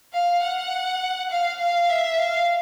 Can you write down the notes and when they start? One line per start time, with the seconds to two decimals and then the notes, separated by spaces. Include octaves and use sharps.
0.13 F5
0.43 F#5
1.31 F5
1.59 F5
1.89 E5
2.18 F5